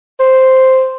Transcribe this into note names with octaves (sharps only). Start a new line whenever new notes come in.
C5